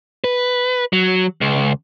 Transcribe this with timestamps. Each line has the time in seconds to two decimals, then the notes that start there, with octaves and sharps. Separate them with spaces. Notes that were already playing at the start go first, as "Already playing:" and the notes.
0.24 B4
0.93 F#3
1.41 C#2